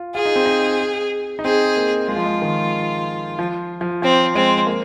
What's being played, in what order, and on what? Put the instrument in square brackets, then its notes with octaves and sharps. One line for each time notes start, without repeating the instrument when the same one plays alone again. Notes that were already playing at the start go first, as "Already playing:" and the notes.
Already playing: [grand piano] F4
[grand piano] F4 [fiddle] G#4
[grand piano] D#4
C4
D#4
D#4
[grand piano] C4 [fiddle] G#4
[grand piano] A#3
[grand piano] G#3 [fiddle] F4
[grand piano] F3
G#3
D#3
F3
F3
[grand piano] F3 [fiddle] C4
[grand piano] G#3 [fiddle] C4
[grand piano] A#3